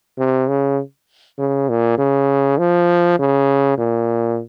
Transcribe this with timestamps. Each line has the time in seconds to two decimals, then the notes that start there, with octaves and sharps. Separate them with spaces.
0.18 C3
0.49 C#3
1.39 C#3
1.69 A#2
1.98 C#3
2.58 F3
3.19 C#3
3.78 A#2